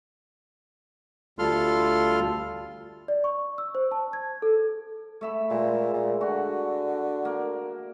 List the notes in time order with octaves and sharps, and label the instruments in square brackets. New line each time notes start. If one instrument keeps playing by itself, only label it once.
[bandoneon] D2 G3 F4 A4 C6 F6
[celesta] D5
C#6
E6
C5
A5
G#6
A4
[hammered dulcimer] A3 E5 B5
[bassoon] A#2 [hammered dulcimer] G#3
[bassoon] A#2
[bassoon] D3 [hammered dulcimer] F#4
[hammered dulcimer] A#3